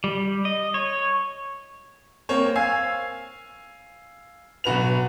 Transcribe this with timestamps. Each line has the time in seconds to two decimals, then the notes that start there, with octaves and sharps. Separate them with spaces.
0.04 G3
0.45 D#5
0.74 C#5
2.29 A#3 C4 C#5
2.55 F5 G#5 E6 G#6 C7
4.64 B1 F#4 B4 F7